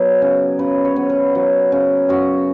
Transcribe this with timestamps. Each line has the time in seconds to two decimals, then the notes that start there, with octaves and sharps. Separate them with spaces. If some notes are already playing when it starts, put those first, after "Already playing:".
Already playing: F#3 B3 B4
0.22 C#3
0.59 C#3 B4
0.85 C#5
0.96 B3
1.09 B4
1.35 F#3
1.72 C#3
2.09 F#2 F#4